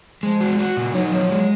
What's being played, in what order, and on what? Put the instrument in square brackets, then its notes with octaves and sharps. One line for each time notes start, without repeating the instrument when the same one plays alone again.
[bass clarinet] F3 [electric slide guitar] G#3
[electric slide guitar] F#4
F#4
A#2
[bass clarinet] F#3 [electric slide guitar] D#4
[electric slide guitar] F3 [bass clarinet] F#3
[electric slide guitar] G#3